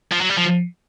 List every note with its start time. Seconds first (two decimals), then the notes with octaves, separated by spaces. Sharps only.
0.12 F3
0.21 F#3
0.30 G3
0.38 F3